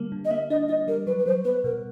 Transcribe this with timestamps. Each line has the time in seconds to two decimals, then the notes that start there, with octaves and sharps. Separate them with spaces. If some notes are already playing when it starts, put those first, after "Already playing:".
Already playing: D3 G3 A#3
0.12 D3
0.25 D#5
0.30 A#3 E5
0.50 D4 D#5
0.68 D4 D#5
0.88 G3 A#4
1.07 F#3 B4
1.19 B4
1.26 F#3 C5
1.44 B3 B4
1.64 B2 A#4